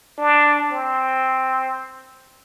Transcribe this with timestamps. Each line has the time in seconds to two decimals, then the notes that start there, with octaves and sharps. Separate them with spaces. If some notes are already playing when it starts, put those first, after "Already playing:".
0.18 D4
0.72 C4